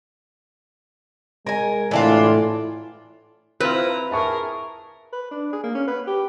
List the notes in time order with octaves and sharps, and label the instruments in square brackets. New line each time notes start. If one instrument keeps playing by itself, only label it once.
[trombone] G#3 [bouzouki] A#4 G#5
[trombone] A2 [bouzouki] E3 D4 F4
[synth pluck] C4 F4 [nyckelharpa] E4 A#5 [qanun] B4
[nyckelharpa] G#4 A#4 [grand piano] E5 A5 C#6
[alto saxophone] B4
D4
G#4
A#3
C#4
B4
G4